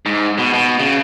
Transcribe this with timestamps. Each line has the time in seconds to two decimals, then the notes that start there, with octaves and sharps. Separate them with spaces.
0.06 G#2
0.38 B2
0.53 B2
0.80 C#3